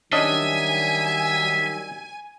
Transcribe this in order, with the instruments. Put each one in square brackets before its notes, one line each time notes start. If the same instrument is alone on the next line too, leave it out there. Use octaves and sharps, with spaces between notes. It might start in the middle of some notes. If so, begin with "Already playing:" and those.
[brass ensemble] D#3 F#3 G3 [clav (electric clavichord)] C#4 D4 D#5 [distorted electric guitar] E5 [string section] G#5